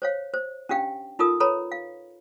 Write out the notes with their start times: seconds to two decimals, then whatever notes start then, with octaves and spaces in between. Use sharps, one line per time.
0.02 C5 C#5 F5
0.34 C5
0.69 C#4 D4 G4 F5 G5
1.19 D#4 F4 A4 A#4 D#6
1.40 A4 B4 C#5 A#5 B5
1.72 F5